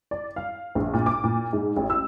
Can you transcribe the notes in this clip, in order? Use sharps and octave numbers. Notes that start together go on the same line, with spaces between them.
D5
F5
A#1
A#2
D6
A#2
G#2
A1
E6